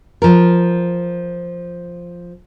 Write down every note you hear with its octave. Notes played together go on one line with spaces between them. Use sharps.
F3 A#4